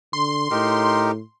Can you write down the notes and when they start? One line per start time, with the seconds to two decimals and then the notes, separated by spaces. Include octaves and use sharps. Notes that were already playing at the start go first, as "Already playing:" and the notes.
0.13 D3 C6
0.51 A2 D#4 G4 A#4